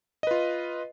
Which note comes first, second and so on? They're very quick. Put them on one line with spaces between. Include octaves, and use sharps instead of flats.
D#5 B4 F4